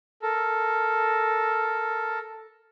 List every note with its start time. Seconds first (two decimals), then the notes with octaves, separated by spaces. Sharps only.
0.22 A4 A#4